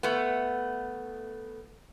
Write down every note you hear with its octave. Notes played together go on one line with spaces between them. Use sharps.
A3 B3